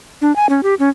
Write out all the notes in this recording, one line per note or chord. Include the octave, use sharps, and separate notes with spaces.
D4
G#5
C#4
G4
C#4